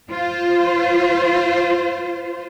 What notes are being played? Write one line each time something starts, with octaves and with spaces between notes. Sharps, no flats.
F4 C5